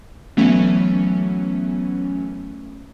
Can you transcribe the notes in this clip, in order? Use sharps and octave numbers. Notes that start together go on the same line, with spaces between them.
E3 F#3 A3 B3 C#4